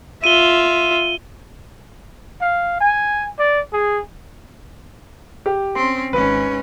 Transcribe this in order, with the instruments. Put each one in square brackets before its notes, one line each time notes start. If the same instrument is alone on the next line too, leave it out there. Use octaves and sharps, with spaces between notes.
[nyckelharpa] F4 E5 [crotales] D#7 G7
[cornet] F5
G#5
D5
G#4
[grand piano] G4
[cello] C4 C#4 [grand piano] C6
[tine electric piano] G#1 [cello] G#2 C#4 [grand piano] B4